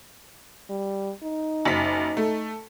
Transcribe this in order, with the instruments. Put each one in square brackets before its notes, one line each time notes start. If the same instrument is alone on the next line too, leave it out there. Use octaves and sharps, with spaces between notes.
[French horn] G3
D#4
[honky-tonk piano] F#1 B6
A3